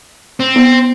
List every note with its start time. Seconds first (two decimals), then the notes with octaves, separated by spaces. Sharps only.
0.40 C4
0.56 B3